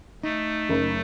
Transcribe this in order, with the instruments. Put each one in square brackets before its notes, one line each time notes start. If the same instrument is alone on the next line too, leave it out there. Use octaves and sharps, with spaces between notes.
[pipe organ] A3 [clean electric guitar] D#4
[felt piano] F#1